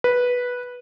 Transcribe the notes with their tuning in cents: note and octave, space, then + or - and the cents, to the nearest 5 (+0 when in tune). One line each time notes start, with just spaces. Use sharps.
B4 -10